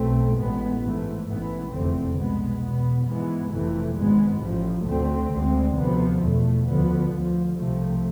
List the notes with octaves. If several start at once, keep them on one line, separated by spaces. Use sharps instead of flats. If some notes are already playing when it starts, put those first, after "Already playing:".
Already playing: B1 B2 A3 C4
A1 A2 G#3 B3
G#2 E3 A3
A1 G#2 E3 B3
F1 E2 D3 A3 C4
C2 B2 G#3 B3
E2 B2 B3
G#2 E3 G#3 B3
F1 F2 C3 E3 A3
G#1 G#2 G#3 B3
A1 A2 F3
D2 D3 A3 C4
D2 D3 G#3 C4
D2 C3 F3 B3
E2 B2 A3
D2 D3 F3 B3
D2 D3 F3
C2 C3 F3 A3